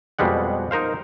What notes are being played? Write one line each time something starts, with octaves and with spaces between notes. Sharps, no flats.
F2 B2 G3 G#3 F#5
D#4 A#4 C5 F5